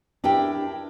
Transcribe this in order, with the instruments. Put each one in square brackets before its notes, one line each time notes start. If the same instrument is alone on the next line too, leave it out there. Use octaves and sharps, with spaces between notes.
[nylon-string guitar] D4 E4 G4 A#4 G5